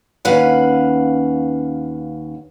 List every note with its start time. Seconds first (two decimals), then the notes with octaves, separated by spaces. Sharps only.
0.25 D#2 C#4 B4 F5 F#5